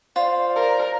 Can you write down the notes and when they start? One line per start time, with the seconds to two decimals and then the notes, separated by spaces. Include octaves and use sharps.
0.16 F4 C5 D5 F5
0.56 A#4